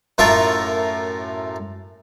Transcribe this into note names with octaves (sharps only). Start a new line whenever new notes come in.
F#2 A2 F4 A4 A#4 C#6